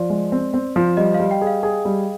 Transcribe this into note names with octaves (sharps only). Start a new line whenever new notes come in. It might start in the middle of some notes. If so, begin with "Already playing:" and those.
Already playing: F3 D5
G#3
C4
C4
F3
G3 D#5
F5
G3
G5
G#4
F5
G#4
G3